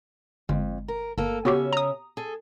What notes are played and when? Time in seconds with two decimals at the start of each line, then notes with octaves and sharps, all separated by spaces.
0.49 G1 F2 G#3
0.88 A#4
1.18 G1 A#3 A4
1.45 C#3 B3 C#4 F#4 G4 E5
1.73 A#5 D#6
2.17 G#4 A4